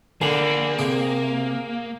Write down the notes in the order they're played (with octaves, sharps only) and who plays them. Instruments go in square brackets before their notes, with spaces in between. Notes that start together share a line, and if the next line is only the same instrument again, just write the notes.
[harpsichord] D3 [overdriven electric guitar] A#3 [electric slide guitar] G#4 D5
[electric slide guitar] C3 [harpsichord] G#4